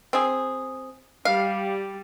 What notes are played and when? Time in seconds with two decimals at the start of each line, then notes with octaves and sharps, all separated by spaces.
0.13 C4 G#4
1.25 G3 F5